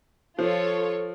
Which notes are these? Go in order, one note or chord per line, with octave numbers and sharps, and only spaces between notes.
F3 F4 A4 C#5